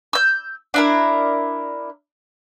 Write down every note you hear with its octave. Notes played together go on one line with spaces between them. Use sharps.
E6 G6
D4 E4 A#4